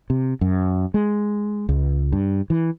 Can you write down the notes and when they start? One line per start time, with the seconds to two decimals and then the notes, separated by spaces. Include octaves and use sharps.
0.10 C3
0.41 F#2
0.94 G#3
1.69 C#2
2.12 G2
2.50 E3